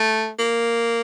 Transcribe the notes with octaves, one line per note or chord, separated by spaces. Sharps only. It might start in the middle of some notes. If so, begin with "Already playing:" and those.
Already playing: A3
A#3